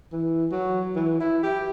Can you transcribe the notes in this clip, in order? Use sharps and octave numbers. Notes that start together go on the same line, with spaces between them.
E3
F#3
E3
E4
G4